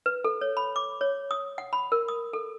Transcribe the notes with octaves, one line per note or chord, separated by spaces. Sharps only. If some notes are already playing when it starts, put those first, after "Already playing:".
B4
A4
C#5
B5
D6
C#5
D#6
F#5
B5
A#4
D#6
A4